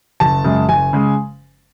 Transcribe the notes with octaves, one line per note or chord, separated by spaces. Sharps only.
F#1 A5
F#2 C#3 G#3
F#1 G#5
C#3 G#3